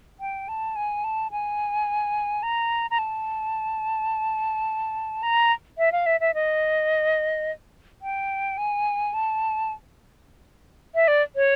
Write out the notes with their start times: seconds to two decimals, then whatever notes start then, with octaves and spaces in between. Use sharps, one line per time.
0.20 G5
0.48 A5
0.76 G#5
1.04 A5
1.31 G#5
2.43 A#5
2.91 A#5
2.98 A5
5.23 A#5
5.78 E5
5.92 F5
6.06 E5
6.20 E5
6.34 D#5
8.02 G5
8.58 G#5
9.13 A5
10.95 E5
11.08 D5
11.36 C#5